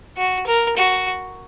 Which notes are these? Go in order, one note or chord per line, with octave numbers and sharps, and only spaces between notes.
F#4
A#4
F#4